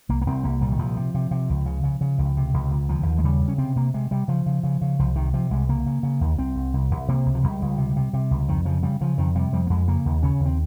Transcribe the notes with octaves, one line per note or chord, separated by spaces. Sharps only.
C2 A#3
A#3
C2 C4
C2 A#3
A#2 G3
D#3
C2 F3
C3
C3
C3
C#2
C#3
C#3
C#3
C#2
C3
C#2
C#2
D#2 F3
D#2
G#3
C#3 G3
C#3
C#4
C3 C4
C3 A#3
C3 G#3
C3 G3
C#3 F3
C#3
C#3
C#3
C2 F3
C3 D#3
C3 F3
C2 G#3
C#3 A#3
C#3
C#3
D#2
C2 C4
C2
C2
C2
C3 A#3
C#2
F3
C#2 G3
C#2
C3
C3
C3
C#2
F2 D#3
C#3 F3
C#3 G3
C#3 F3
F2 D#3
C3 G3
F2 G3
A#3
F2 G#3
C#3 A#3
D#2
C#3 C#4
D#2
C4